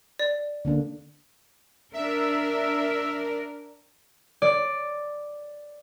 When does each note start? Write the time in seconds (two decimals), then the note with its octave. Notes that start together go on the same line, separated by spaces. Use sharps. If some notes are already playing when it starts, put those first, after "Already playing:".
0.19 D5
0.65 D3 A#3 D4
1.93 D4 A#4 E5
4.42 D5